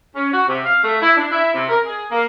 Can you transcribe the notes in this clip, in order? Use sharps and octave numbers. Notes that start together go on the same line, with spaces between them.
C#4
F#4
C3
F5
A3
E4
D4
E4
C3
A#4
G#4
A#3